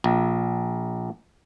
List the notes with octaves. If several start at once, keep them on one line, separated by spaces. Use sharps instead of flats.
A#1